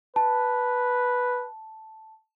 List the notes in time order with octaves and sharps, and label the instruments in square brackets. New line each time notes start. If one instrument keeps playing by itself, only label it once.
[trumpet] B4 [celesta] A5